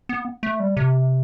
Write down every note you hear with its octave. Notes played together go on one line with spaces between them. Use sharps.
B3
A3
G3
C3